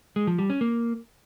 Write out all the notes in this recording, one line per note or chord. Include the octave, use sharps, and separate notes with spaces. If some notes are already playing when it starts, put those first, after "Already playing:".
G#3
F3
G3
C#4
A#3